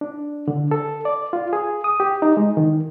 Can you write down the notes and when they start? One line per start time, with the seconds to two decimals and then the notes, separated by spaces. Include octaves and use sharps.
0.01 D4
0.48 D3
0.71 A4
1.05 D5
1.33 F4
1.53 G#4
1.84 D#6
2.00 G4
2.22 D#4
2.37 G#3
2.57 D#3